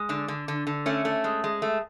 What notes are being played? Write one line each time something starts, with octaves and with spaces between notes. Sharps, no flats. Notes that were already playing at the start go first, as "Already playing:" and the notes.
Already playing: G#3
D3 D4
D3
D3
D3
A3 C#4
A3
G#3
G#3
A3